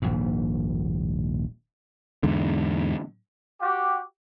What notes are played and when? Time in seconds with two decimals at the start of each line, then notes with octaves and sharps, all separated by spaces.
0.02 D#1 A#1 G#2
2.23 E2 G#2 D3
3.61 F#4 G4